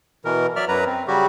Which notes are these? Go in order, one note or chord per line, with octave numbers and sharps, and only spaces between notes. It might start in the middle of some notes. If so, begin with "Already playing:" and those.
B2 E3 A#4
F#3 D5 E5 F6
F#2 F#3 B4 A#5
C4
C#3 F#3 G3 F#4 G4